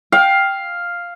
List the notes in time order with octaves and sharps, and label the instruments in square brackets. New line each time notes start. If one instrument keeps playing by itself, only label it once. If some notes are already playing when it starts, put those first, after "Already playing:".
[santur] F5 [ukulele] G5